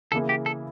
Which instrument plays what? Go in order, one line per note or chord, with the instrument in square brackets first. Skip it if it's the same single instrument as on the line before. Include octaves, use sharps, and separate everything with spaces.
[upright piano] C#3 E3 A#3 E4 [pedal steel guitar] A4
[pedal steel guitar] G4
A4